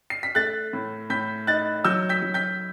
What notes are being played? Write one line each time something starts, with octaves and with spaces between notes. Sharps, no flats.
C7
B6
A3 F#6 A6
A2
A2 G6 B6
D#4 F#6 A6
F#3 E6 G6
G6 B6
F#3
G6 B6